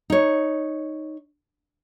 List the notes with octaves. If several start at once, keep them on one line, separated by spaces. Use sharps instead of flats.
D#4 C#5